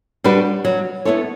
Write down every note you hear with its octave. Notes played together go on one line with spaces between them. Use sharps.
G3 D4 F#4 B4
F#3
B3 E4 A4 C#5